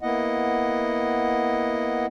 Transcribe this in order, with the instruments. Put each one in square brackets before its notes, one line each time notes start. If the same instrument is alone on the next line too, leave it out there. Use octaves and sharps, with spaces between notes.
[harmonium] A#3 B3 E4 D#5 F#5